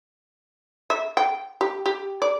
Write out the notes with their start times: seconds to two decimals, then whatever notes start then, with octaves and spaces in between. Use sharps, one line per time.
0.90 E5
1.17 G5
1.61 G4
1.86 G4
2.22 D5